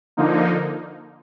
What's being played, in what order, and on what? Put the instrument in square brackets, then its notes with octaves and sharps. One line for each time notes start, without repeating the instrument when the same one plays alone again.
[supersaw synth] D3 F3 A#3 D#4